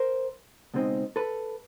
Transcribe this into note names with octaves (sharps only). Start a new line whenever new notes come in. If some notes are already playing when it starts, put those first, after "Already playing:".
Already playing: A#4 C5
C#2 B2 G#3 C4 D#4
A4 B4